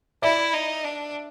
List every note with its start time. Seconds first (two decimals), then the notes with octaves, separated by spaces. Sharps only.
0.22 E4 D5 E5
0.54 D#4
0.84 D4